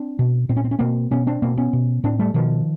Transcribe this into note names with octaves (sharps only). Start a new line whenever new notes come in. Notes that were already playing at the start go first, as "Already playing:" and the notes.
Already playing: C4 D4
B2
A#2 C4
C#4
C4
C#4
B2 A#3 C4
B2 B3 C#4
C4 D4
B2 A#3 C4
B3 C#4
B2
A2 C4 D4
G3 A3
B2 D#3 F3